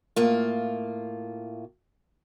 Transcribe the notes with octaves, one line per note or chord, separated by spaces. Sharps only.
A2 A#3 F4